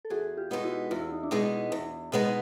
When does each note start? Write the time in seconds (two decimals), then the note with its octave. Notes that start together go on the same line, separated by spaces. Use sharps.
0.05 A4
0.10 E2 F#4 G#4
0.37 F4 G4
0.51 B2 G#3 B3 D#4
0.64 E4 F#4
0.91 E2 F4
1.01 E4
1.12 D#4
1.23 D4 E4
1.31 B2 G#3 B3 D#4
1.72 E2
2.12 B2 G#3 B3 D#4